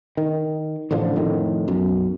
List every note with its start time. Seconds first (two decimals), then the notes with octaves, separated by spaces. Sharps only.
0.17 D#3
0.91 A1 A2 D3 F3
1.16 F2 A2 D#3
1.68 B1 F#2